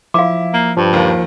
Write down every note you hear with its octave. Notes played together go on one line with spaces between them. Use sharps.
F3 E4 F5 D6
A#3
G2 F3
D#2 D#3